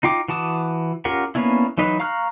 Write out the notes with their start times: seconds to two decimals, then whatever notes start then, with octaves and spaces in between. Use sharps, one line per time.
0.03 D#4 F4 G5 D6
0.28 E3 F#4 A5 D6 D#6
1.05 C#4 F4 G4 A#4 F#5
1.35 A#3 B3 C#4 D4 E4
1.78 E3 F#3 D#4 B4
2.00 F5 A#5 C#6 F6 F#6